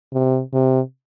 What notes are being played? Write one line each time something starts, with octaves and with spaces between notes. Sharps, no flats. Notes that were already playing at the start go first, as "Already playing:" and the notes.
C3
C3